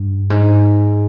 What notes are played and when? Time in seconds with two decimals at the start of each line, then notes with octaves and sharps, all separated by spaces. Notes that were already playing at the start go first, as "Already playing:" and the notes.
Already playing: G2
0.30 G#2